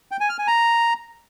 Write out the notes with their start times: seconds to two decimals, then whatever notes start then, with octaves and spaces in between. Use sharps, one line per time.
0.11 G5
0.20 G#5
0.29 F6
0.38 G#5
0.47 A#5